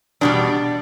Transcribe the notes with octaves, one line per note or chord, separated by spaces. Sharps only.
E2 B2 G3 D4